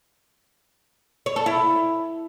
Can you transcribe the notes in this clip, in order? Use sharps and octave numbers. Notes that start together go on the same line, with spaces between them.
C#5
A4
E4